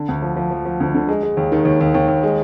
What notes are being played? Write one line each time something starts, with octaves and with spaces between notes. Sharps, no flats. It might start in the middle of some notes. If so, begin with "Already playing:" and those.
Already playing: D3
D2
F3
F3
F3
F3
D2
D3
G#3
G#3
D#2
D#3
D#2
D#2
D#2
D#2
G#3